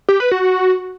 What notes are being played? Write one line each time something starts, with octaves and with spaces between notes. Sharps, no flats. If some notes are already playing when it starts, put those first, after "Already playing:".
G4
B4
F#4